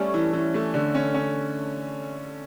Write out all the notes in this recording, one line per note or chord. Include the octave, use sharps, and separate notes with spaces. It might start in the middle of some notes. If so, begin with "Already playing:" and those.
Already playing: G3 A3 C#4
E3
E3
A3
D3
C#4
C#4